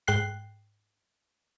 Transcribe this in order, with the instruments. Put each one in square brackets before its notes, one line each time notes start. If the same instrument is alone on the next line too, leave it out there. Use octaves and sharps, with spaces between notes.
[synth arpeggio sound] G#2 G5 F#6 C7